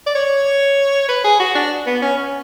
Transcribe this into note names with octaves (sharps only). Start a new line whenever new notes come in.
D5
C#5
B4
G#4
F#4
D4
B3
C#4
C#4